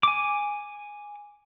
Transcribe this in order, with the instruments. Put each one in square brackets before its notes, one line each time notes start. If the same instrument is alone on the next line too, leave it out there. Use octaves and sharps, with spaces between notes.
[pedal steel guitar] G#5 D6